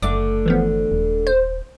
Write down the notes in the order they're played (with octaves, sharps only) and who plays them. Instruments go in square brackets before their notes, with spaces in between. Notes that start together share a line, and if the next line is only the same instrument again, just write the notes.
[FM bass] F#1 [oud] D3 A3 D4 [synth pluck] D6
[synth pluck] E3 F3 B3
[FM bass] D#1
[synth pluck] C5